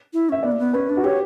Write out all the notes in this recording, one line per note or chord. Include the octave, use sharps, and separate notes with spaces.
E4
C#4 E5
B3 D5
A#3
B3
C#4 B4
D4
F#4
G4 C#5